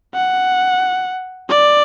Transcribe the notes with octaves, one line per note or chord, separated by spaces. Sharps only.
F#5
D5